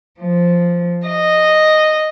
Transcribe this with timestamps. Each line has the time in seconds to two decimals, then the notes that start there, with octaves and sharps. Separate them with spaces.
0.20 F3
1.09 D#5